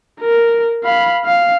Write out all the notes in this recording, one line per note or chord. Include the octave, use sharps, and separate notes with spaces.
A#4
F5 B5
F5